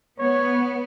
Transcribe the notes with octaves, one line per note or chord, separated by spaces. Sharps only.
B3 C#5